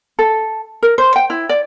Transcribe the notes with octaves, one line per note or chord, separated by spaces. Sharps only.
A4
A#4
C5
G5
E4
D5